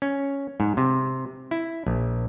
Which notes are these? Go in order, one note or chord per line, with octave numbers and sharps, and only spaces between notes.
C#4
G#2
C3
E4
A#1